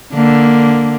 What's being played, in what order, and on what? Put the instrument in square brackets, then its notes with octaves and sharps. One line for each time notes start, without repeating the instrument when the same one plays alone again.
[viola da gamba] D3 A#3